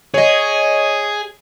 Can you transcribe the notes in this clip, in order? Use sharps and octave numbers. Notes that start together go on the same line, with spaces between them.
G#4 C#5 D#5